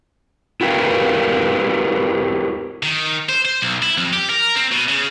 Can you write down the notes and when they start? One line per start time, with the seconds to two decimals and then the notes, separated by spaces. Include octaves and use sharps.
0.61 E4 F#4 G4 A#4 B4 F5
2.83 D#3
3.29 C5
3.45 C5
3.62 B1
3.83 E4
3.98 F2
4.13 G4
4.30 A#4
4.56 C4
4.72 B2
4.89 C#3